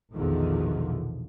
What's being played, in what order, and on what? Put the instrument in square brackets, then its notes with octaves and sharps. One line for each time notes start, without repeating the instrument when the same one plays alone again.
[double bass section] A#1 E2 B2 D3 D#3 F3